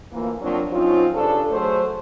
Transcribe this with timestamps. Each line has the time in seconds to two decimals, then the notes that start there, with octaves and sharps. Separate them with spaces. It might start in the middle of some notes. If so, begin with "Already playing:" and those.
0.13 D2 E3 F3 A#3
0.42 F3 F#3 A#3 C4 D4
0.72 F3 F#3 C4 C#4 D#4 F4
1.14 G2 C#3 D4 A4
1.51 F#3 A3 G#4 C5